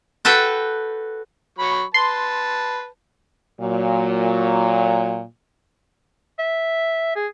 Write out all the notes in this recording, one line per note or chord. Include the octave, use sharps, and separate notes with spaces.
F#4 A4 B4 G5
F#3 B5 C#6
B4 A5 C6
A#2 F#3
E5
G#4